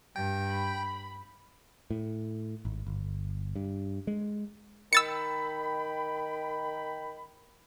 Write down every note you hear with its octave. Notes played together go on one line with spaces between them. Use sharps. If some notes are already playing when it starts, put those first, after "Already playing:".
G2 G5
B5
A2
G#1
G1
G2
G#3
D#3 G5 B5 E6 A6 C#7